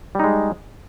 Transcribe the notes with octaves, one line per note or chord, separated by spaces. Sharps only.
G3 G#3 D#4